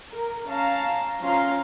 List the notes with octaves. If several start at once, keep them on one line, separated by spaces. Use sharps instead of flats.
A#4
C#4 F5 A5 A#5
F3 C#4 F4 F5 A#5 C6